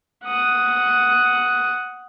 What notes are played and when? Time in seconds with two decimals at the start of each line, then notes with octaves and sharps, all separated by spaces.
0.24 F#5 D#6